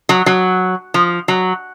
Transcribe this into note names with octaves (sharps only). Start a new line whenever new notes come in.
F#3
F#3
F3
F#3